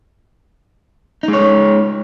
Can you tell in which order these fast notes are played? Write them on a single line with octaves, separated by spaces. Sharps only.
D#4 G#3 C#5